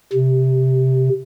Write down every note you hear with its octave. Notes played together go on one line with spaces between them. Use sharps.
C3